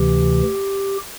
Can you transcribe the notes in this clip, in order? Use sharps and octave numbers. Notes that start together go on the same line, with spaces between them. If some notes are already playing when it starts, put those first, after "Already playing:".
Already playing: D2 C3 E3 G4